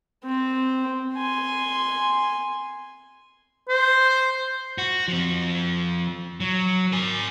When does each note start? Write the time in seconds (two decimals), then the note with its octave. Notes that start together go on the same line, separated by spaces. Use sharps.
0.24 C4
1.15 G#5 C6
3.69 C5
4.78 F#4
5.08 F3 C4
6.40 F#3
6.92 A#4 G#5